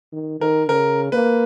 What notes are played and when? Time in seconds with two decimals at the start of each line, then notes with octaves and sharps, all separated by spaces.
0.13 D#3
0.41 D#3 A#4
0.69 C#3 A#4
1.12 A#3 B4